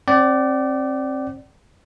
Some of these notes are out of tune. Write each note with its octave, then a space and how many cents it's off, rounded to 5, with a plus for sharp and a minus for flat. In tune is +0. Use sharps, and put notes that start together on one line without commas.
C4 +30 D5 +0 G5 -45